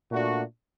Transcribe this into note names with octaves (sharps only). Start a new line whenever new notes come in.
A#2 A3 D4 F#4